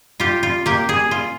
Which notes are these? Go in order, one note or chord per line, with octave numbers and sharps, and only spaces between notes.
F4 G4
F4
A#3 G4
G#4
F4